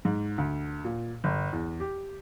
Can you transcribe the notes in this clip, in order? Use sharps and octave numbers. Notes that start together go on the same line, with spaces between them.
G#2
D2
A#2
G1
E2
G4